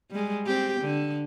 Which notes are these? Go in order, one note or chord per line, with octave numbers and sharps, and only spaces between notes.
G3 G#3
C4 G4
D3